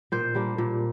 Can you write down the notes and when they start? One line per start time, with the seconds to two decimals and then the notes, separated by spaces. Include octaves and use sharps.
0.12 A#2 C5
0.35 G3 A#3 D4
0.58 A#2